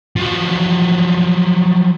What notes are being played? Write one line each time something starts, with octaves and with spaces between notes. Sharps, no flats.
F3 F#3